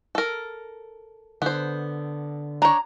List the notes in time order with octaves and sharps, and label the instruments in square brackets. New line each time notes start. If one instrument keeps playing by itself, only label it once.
[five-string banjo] A4 A#4
[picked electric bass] D3 [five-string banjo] B3 C5
[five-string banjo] D4 C#5 [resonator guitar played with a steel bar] A#5